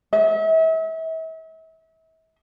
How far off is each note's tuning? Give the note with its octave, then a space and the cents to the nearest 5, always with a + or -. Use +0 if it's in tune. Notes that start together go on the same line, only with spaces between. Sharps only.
E5 -40